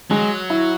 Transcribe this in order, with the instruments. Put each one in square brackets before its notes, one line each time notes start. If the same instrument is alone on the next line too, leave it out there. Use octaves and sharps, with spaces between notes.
[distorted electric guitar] F#3 [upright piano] G#3
[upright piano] E4